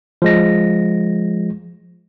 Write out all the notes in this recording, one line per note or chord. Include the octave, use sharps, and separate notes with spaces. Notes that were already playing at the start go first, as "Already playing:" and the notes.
F3 G#3 A#6